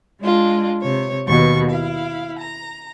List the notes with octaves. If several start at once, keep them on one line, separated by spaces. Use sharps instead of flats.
G#3 D4 F4
C3 C#5
D#2 B2 B4 C#6
E4 F5
A#5